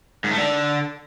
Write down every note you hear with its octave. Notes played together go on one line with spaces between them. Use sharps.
G#2
A3
D3